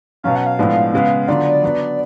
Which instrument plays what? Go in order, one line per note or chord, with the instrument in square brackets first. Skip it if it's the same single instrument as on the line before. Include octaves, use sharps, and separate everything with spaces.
[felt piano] B2 F#3 C#4 [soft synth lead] F5
[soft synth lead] F#5
F5
[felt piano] A2 F3 G#3 B3 D4
C#3 G#3 B3
[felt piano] D3 F#3 B3 D4 F4 [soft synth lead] D5
[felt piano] F#3 B3 D4